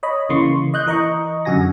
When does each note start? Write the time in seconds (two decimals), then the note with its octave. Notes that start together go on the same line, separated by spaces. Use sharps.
0.03 C#5 D#5 B5
0.29 C#3 E3 A#3 C6 C#6
0.74 D#5 F#6 G6
0.86 E3 A#4 D#5 A#5 C#6
1.45 F#2 D3 F#4 G#5 A#6